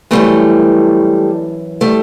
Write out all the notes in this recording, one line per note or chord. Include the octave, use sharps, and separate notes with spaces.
F#2 C#3 E3 G3 A3
G3 A3